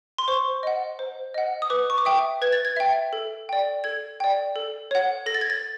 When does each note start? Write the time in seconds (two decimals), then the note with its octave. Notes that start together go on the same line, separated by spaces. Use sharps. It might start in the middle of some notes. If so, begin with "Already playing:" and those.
0.18 C6
0.28 C5 C#6
0.63 D#5 F#5
0.99 C5
1.34 D#5 F#5
1.62 D#6
1.70 B4 D6
1.90 C#6
1.98 D6
2.05 E5 G5 D#6
2.42 B4 G#6
2.52 A6
2.65 G#6
2.76 E5 G5
3.13 A4
3.49 D5 G5
3.84 A4 G#6
4.20 D5 G5
4.56 A4
4.91 C#5 F#5
5.26 A4 A#6
5.34 A6
5.41 G#6
5.50 A6